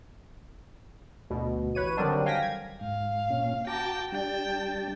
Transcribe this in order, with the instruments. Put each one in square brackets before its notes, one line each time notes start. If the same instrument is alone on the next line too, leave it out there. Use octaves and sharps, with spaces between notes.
[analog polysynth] D2 B2
A1 B4 C#5 D#7
D3 D#3 F#3 G3 C4 D4
F5 G5 G#5 A#6 B6
G#6
[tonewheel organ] G#2 [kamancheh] F5
[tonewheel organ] A#2 C#4
[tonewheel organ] F#4 A#5 D6 [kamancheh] G5 A5
[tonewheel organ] G3 D4 A5 [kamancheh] G5